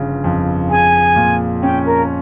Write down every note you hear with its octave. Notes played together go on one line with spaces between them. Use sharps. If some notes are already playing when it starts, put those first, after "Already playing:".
Already playing: G1 C#3 F3
F2
G#4 G#5
A#2
C#4 G5
A#4